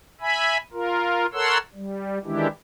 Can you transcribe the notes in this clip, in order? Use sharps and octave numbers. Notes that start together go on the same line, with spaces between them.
E5 G#5 B5
F4 A#4
A4 A#4 C#5 F#5 C6 E6
G3
D#3 E3 G#3 D4 E4 G4